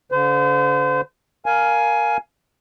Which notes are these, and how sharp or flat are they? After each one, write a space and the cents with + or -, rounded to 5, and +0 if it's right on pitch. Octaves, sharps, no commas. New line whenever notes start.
D3 -45 C5 -35
A#4 +0 F5 +0 G#5 +15